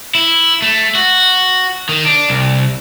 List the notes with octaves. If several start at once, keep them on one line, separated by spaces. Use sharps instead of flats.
E4
A3
F#4
D#3
D4
C2